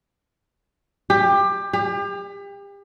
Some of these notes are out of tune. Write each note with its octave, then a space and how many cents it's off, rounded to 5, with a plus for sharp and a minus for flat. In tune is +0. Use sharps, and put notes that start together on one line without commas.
G4 +20
G4 +35